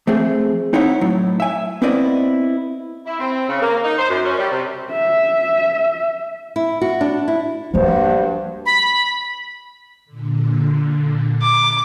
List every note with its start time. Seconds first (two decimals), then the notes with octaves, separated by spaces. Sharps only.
0.07 F3 A3 C4 G#4
0.73 C4 D#4 E4 C#5 F#5
1.01 A2 F#3
1.40 E5 G#5
1.82 B3 C4 E4 B4 D5 D#5
3.06 E4
3.20 C4
3.49 C#3
3.62 A#3
3.84 D#4
3.99 C5
4.10 F#2
4.25 C#4
4.38 G3
4.51 C3
4.91 E5
6.56 E4
6.81 F#4
7.01 D4
7.28 E4
7.74 G2 F3 A#3 F#4 C5
8.66 B5
10.06 A#2 D3
11.42 D6